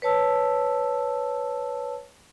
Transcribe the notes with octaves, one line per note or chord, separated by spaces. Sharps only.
B4 C#5 A5 E6